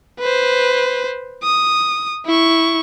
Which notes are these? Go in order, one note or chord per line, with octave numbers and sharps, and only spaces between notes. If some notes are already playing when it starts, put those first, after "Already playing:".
B4 C5
D#6
E4 C#6